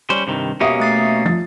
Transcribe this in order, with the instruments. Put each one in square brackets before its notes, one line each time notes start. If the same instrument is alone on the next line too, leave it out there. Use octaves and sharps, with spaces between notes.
[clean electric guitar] G3 C#4 C5
G2 C3 D#3
[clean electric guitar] B2 A#3 C#4 [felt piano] G4 E5 D#6
[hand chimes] A3 A6 C7
[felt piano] F3 A6